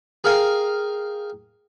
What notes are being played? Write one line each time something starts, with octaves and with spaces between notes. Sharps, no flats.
G#4 A#4 F5 G5 G#5